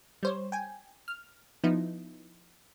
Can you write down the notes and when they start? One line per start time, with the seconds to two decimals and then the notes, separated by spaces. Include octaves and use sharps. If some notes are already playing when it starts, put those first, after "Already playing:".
0.23 G3 C5 C#5
0.52 G5 G#5
1.08 F6
1.64 F3 B3 D#4 E4